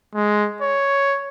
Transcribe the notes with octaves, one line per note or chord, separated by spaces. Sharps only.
G#3
C#5